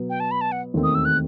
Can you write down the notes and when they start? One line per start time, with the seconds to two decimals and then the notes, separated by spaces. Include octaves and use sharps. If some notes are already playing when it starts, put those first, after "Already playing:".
Already playing: B2 F#3 B3
0.10 G5
0.20 A5
0.31 B5
0.41 A5
0.52 F#5
0.74 E1 D#2 D#3 A3 C4
0.83 D#6
0.95 E6
1.05 F#6